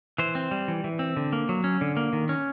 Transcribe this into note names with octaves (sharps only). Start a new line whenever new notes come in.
E3 C5
C4
G3
E3
E3
C4
D3
A#3
F#3
C#4
D3
A#3
D#3
C#4